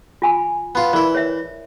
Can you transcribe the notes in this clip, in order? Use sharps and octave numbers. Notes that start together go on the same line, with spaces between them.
F4 G#5 B5
B3 F4
E3 E4 A#4 D5
C#5 E5